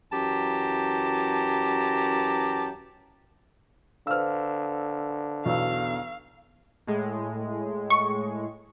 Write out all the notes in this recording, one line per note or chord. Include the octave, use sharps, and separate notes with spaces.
F#2 E3 G4 A5 A#5
D3 B4 C5 F5 E6 F6
B1 E2 F5 C#6 E6
A2 G#3
C#6